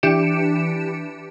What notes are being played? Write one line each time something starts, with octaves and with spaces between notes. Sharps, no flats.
E3 D4 G4 C#7 D7 E7